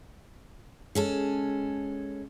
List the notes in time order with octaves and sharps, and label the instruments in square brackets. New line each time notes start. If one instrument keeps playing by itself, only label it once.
[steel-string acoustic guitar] G#3 C#4 A4